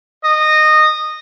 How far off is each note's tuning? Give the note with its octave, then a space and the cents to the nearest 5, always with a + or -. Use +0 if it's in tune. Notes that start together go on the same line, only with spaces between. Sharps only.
D#5 -15